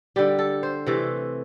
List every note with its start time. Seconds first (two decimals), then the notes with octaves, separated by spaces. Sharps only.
0.16 D3 G3 G4
0.39 A4
0.63 C5
0.86 C3 E3 A3